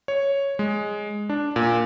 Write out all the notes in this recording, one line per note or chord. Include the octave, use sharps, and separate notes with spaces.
C#5
G#3
D4
A#2